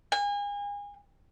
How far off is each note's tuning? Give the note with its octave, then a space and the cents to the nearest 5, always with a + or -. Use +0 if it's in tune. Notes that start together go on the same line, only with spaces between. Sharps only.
G#5 -35